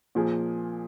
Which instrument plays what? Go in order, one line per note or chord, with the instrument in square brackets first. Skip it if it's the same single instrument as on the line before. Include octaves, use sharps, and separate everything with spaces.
[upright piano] A#2 F3 A#3 G#4